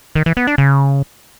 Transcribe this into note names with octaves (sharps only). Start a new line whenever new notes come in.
D#3
E3
B3
D4
C#3